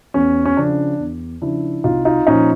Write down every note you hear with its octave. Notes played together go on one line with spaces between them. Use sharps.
E2 C#4
C#4
C#3 F3 D4
E2
C#3 F3 D4 E4
C2 D#4 F4
D#4 F4
A#2 F3 C#4 D#4